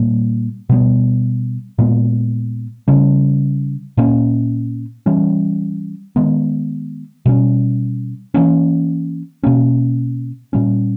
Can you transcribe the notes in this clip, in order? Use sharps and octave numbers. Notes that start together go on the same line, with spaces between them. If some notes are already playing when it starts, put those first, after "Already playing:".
Already playing: A#2 G3 A#3
B2 G3 B3
A#2 G#3 B3
C#3 G3 C#4
A#2 A#3 C#4
E3 G3 C#4
D#3 G#3 B3
B2 G3 C#4
E3 A#3 C#4
B2 A#3 C#4
A#2 G3 C#4